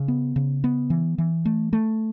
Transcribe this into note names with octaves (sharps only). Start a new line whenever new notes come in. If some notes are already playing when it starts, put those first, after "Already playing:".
Already playing: C#3
B3
C#3
B3
E3
E3
A3
A3